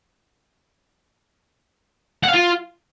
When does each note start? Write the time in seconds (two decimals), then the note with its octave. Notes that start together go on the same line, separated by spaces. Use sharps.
2.24 F#5
2.29 F5
2.34 F4